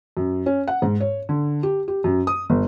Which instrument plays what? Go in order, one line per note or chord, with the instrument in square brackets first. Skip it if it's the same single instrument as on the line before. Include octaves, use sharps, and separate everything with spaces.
[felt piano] F#2
C#4
F#5
G#2
C#5
D3
G4
G4
F#2
D#6
G1